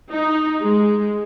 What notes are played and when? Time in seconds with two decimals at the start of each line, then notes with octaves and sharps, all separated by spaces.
0.11 D#4
0.60 G#3